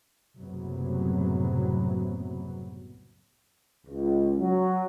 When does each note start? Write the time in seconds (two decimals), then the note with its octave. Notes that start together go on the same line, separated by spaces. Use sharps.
0.38 F#1 C2 A2 C3 F#3 B3
3.87 C#2
4.39 F#3